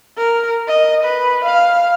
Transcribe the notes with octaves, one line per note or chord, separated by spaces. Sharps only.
A#4
D#5
B4
F5